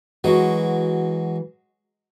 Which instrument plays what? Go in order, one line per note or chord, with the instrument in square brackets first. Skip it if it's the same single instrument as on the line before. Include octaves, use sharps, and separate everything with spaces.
[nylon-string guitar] E3 F#4 [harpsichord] F#3 G#3